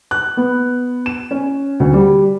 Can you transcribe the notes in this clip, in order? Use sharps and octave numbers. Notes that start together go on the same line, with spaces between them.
F#6
B3
E7
C#4
D2
G3